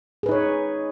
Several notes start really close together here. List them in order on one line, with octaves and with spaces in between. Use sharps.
G#4 B4 D#4 C#5